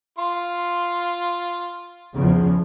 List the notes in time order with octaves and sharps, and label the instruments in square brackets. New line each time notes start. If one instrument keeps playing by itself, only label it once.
[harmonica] F4 C6
[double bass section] E2 C#3 F3